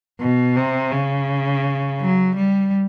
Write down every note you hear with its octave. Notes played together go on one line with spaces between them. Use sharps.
B2
C3
C#3
F#3
G3